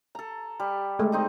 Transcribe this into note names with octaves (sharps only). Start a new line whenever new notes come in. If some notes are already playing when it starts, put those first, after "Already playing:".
A4 A#5
G3
G#3 A3
C4 D#4 D#5